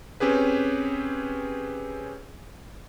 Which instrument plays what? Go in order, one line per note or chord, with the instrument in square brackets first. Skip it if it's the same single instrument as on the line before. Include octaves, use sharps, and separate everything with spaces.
[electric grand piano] C4 C#4 G4 G#4 B4